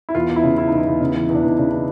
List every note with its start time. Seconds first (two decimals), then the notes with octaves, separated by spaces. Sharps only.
0.09 E4
0.15 E2 F4
0.29 E2
0.36 E4
0.44 C#3
0.57 E3 E4
0.68 E2 D#4
0.78 E4
0.87 E2
1.01 C#3
1.14 E3
1.29 E2
1.34 D4
1.43 E2 D#4
1.57 C#3 D4
1.72 E3 D#4